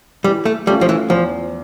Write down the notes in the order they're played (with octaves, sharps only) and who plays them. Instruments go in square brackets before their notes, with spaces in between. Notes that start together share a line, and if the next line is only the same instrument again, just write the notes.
[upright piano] E3 [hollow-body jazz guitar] G3
[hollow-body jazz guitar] A3
[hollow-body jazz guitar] G3 [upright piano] A3 C#4 F4
[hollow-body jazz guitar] F3
E3
[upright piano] E2 [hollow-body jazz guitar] F3